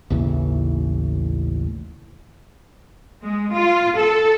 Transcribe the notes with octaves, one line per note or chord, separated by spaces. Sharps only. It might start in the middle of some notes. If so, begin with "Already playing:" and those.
A1 D#2 C#3 E3
G#3
F4
A4